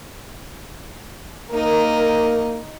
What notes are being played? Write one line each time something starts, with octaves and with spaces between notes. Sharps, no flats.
A#3 D#4 A#4 D#5